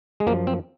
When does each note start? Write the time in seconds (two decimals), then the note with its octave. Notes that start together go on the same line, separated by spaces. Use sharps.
0.20 G#3
0.26 F#2 F3 A#3
0.47 C4